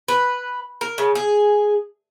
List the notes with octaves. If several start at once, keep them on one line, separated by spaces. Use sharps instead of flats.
B4
A#4
C#3
G#4